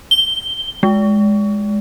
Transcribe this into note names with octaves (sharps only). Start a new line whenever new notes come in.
G7
G#3